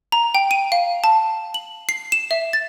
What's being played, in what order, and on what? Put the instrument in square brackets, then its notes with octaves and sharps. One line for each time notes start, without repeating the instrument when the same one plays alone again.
[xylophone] A#5
G5
D#7
F5
A5
F#7
C7
E7
E5
A6